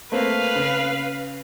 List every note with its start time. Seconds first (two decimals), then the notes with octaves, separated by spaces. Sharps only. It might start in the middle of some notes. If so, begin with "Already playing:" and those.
0.12 A3 A#3 C4 B4 F5
0.55 C#3